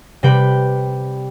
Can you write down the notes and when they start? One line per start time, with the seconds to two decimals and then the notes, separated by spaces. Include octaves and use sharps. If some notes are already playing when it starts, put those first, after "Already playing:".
0.23 C3 G3 B4 G5 B5